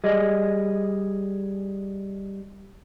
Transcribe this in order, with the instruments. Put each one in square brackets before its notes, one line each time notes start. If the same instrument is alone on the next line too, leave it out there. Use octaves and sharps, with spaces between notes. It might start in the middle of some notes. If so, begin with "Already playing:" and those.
[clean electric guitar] G3 G#4 D#5